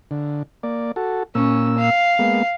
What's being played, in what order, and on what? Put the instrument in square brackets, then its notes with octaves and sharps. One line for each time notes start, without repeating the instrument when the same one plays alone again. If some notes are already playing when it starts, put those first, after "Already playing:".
[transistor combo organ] D3
A#3 D5
F#4 A4
[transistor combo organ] A#2 A#3 E6 [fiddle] C#4
[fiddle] F5
[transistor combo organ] G#3 A#3 B3